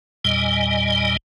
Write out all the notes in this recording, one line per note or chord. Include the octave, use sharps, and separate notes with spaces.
E2 A#2 G3 D#5 G#5